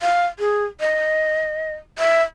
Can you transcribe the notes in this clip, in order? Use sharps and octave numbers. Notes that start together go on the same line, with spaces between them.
F5
G#4
D#5
E5